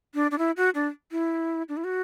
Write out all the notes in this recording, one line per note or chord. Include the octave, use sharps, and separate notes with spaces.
D4
D4
E4
F#4
D4
E4
D4
E4
F#4